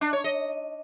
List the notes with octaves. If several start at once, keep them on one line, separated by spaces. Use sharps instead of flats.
D4
C#5
D#5